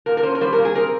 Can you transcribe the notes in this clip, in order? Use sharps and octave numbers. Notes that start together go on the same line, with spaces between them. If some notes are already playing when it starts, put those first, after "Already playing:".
A#2 A#4
A#4
C#4 C5
A#4
G3 C5
A#4
A#2
G#4
C4 A#4